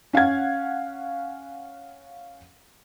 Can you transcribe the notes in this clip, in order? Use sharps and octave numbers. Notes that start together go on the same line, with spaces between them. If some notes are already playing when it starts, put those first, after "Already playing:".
C#4 F5 F#5 G#6